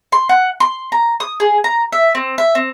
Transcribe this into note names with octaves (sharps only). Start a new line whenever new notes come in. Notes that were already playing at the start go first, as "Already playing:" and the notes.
C6
F#5
C6
A#5
D#6
G#4
A#5
E5
C4
E5
C4